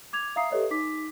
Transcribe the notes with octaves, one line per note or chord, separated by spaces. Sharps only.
D6 G#6 F7
E5 F5 A#5 D#6 C7
G4 A4 B4 C#5 D#5 E5
D#4 D6 B6